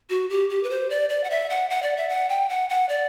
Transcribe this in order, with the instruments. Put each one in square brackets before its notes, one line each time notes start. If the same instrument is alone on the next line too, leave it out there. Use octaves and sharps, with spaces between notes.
[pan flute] F#4
G4
G4
B4
C5
D5
D5
F#5
E5
F#5
F#5
D5
E5
F#5
G5
F#5
F#5
D5